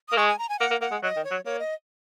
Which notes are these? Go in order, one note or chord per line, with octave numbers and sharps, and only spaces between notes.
D#6
A#3
G#3 C#6
G#5
A#5
G#5
A#3 F#5
A#3
A#3 F#5
G#3
F#3 D#5
D#3
C#5
F#3
A#3 C#5
D#5